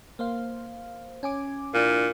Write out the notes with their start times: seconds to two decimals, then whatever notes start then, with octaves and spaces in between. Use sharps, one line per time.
0.19 A#3 C5 F5
1.23 C#4 G#5 D6
1.74 A#2 D4 E4